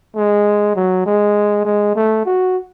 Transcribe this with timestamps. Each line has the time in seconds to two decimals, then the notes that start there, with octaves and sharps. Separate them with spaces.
0.16 G#3
0.76 F#3
1.06 G#3
1.65 G#3
1.96 A3
2.26 F#4